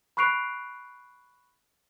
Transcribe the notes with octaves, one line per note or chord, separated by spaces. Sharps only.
B5 C#6 F#6 C7 D7 F7